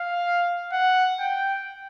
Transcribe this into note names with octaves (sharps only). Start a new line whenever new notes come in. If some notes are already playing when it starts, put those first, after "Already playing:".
Already playing: F5
F#5
G5